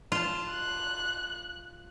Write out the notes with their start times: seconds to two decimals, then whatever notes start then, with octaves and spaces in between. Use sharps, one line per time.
0.12 F4 A5
0.51 F#6